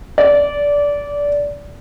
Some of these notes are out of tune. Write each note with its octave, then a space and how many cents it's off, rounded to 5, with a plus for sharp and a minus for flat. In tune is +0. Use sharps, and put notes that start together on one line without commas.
D5 -20